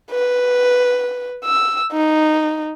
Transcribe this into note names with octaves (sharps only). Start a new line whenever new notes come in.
B4
E6
D#4